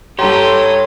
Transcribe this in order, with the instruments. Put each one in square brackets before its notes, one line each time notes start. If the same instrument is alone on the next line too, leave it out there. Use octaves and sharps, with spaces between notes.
[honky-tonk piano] G2 C6 [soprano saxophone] G4 [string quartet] A4 D#6 E6 [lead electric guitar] C#5 A#5